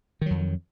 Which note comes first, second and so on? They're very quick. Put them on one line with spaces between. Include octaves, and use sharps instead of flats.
D#3 F#3 F2